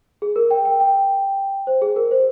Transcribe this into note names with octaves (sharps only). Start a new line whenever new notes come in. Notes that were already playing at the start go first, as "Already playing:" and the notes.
G#4
A#4
G5
G5
G5
C5
G#4
A#4
C5